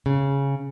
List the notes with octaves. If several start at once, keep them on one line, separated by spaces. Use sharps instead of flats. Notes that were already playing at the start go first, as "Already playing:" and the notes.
C#3